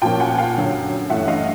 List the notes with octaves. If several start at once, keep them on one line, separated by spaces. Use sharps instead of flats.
A#2 F3 A#3 C#4 G5 A5
F#5 G#5
F5 G5
F#2 D3 F#3
G2 E3 A3 C#4 E5 F#5
D#5 F5